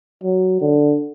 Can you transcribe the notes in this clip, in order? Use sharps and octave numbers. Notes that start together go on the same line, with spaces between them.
F#3
D3